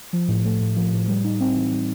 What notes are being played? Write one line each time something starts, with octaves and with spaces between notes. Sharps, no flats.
F3
A2
A3
A2
F3
A2
G3
D#4
C4
E3
G3